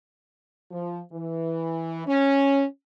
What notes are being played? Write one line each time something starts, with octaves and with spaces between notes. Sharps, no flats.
F3
E3
C#4